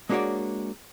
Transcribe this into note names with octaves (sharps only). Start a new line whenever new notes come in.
G#3 A#3 D4 F#4 C#5 D5